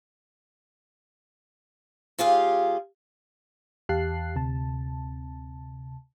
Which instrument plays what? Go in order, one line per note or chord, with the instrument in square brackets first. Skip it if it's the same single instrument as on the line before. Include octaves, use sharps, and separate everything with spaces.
[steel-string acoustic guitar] D#2 F4 G4 G#4 F5
[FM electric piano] E2 G4 F5 A5 F#6 C7
D2 C3 A5